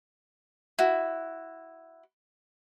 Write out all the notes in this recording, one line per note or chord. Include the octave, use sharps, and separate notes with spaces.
E4 F#4